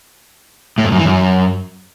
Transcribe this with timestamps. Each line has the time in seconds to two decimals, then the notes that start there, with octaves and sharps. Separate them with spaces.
0.78 A2
0.85 F2
0.92 F#2
0.99 E3
1.06 F#2